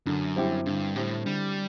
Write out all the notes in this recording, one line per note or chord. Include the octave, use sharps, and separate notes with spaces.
F#2 D3
G3 C4 E4 G4
G2 D3
A2 G3 C4 E4 G4
D3 G3